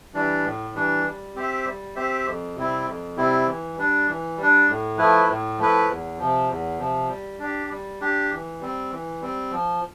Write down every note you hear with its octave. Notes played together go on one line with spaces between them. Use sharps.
E3 G3 D4
A2
E3 G3 D4
G3
C4 G4 C5 E5
G3
C4 G4 C5 E5
F2
C3 G3 C4 E4
F2
C3 G3 C4 E4
E3
G3 D4
E3
G3
D4
A2
F3 A3 E4 B4
A2
F3 A3 E4 B4
E2
C3 F3
E2
C3 F3
G3
D4 G4
G3
D4 G4
E3
G3 C4
E3
G3 C4
F3